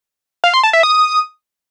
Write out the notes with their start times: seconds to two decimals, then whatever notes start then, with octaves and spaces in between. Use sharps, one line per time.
0.44 F5
0.54 C6
0.63 A5
0.73 E5
0.83 D#6